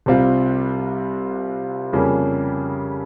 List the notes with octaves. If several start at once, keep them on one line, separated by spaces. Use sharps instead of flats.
C2 C3 G3 C4 F4
F2 C#3 G3 A#3 C#4